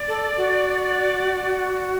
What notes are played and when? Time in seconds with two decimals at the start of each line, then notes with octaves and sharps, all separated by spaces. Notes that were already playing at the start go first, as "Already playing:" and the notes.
Already playing: D5
0.08 A4
0.37 F#4